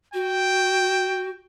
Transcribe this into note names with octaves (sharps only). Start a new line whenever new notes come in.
F#4 G5